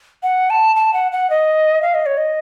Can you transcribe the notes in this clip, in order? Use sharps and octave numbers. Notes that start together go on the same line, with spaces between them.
F#5
A5
A5
F#5
F#5
D#5
F5
D#5
C#5
D#5